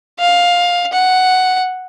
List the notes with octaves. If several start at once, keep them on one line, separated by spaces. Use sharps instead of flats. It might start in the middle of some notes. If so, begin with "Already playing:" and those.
F5
F#5